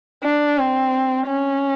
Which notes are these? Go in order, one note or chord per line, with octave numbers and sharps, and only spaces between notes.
D4
C4
C#4